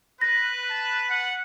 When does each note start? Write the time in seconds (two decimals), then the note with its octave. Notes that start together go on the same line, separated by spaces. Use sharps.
0.21 B4 A#6
0.70 A5
1.09 F#5